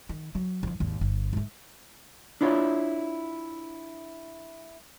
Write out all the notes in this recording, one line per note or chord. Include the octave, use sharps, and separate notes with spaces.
D#3
F#3
F2 E3
G#1 D#2
G1
G#2 A3
D4 E4 F4 C#5